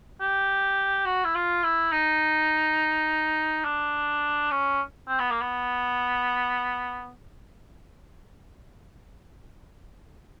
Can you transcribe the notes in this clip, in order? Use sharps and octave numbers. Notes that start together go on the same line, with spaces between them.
G4
F#4
E4
F4
E4
D#4
D4
C#4
C4
B3
A#3
B3